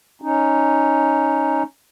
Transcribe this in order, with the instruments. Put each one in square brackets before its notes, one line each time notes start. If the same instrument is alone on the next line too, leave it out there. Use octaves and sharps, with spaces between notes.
[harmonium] C#4 D#4